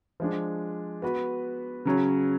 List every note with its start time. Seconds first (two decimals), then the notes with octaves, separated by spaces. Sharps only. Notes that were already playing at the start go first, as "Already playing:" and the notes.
0.20 F3 G#3 D4
1.02 B3 F#4 B4
1.85 C#3 F#3 C#4